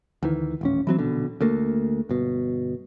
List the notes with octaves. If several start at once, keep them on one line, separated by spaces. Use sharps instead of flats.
D2 D#3 E3
D#1 A1 C#4
E3 F#3 C4
A#1 B2 D3
D2 A3 A#3
G1 B2